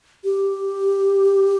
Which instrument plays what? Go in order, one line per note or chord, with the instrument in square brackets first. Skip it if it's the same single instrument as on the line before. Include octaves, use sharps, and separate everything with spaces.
[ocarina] G4